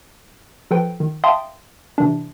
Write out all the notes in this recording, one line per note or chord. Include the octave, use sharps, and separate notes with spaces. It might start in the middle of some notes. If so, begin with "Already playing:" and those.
F3 A4 B4 G5
D#3
E5 F5 G5 A5 C6 D#6
C3 E3 D4